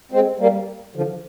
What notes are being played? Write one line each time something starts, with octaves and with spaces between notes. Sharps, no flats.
G#3 C4
G3 A#3
D3 F3